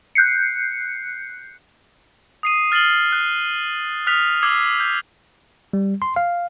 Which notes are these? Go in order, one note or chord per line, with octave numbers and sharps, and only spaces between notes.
F#6 G6 C7 C#7
D#6 C7 D#7
F6 A6 C7 F#7 G7
F#6
D#6 F6 F#6 B6 F7
D6 E6 G#6 C7
G6
G3
C6
F5